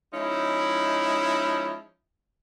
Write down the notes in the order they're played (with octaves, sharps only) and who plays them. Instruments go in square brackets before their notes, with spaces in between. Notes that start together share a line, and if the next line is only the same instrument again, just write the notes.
[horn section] F3 G#3 C#4 D#4 E4